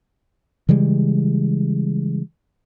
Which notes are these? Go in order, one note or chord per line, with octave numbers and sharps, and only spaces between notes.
C#3 E3 G3 G#3